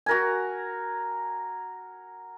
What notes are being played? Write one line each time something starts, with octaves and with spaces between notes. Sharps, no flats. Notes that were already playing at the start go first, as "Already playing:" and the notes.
F#4 A#4 G#5